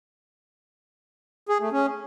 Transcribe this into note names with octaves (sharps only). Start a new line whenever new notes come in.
G#4
A3
C#4